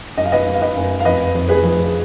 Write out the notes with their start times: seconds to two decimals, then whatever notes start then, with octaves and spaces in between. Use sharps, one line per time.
0.17 F#2 D#5
0.25 F5
0.32 B4 D#5
0.46 F#2
0.54 F5
0.62 B4 D#5
0.77 F#2
1.00 F5
1.05 F2 B4 D#5
1.35 F2
1.49 G#4 B4
1.63 F3